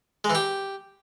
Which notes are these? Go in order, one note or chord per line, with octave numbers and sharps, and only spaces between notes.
G#3
E3
G4